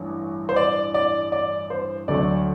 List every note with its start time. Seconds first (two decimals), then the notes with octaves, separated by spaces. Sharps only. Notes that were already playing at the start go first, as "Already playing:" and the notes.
Already playing: A1 G2 E3
0.49 C5
0.56 D5
0.94 D5
1.32 D5
1.70 C5
2.08 D2 D3 F#3 A3 D5